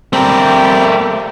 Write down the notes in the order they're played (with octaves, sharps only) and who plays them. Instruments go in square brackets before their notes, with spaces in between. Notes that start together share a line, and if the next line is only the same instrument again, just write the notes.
[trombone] G3 [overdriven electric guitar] A3 A#4 [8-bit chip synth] C4